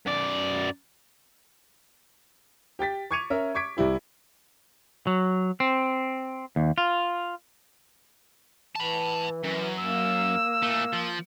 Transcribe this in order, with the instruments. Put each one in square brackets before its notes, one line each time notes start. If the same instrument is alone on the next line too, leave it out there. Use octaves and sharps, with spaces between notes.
[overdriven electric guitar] F#2 D5
[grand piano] G4 G5 A6 B6
C#6 D6 G#6 C#7 D#7 F7
C#4 A#4 E5
C#6 D6 G#6 B6 D7
C2 G3 E4 G4
[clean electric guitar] F#3
C4
D#2
F4
[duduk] E3 [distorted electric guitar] A5 B5
[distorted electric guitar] F#2 [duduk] E3
[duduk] A#3 [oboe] E6
[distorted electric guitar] A#2 A3
F3